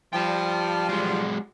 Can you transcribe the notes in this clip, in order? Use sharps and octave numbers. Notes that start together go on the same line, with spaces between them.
F3 G3 G5 A5
F#3 G#3